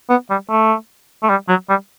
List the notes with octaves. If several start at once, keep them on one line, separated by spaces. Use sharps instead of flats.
B3
G3
A3
A3
G3
F#3
G3